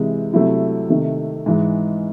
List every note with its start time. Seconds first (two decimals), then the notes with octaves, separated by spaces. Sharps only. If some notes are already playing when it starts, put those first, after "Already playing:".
Already playing: C3 E3 G#3
0.33 C3 F#3 A3 E4
0.89 C3 D#3 A3
1.46 G#2 E3 G#3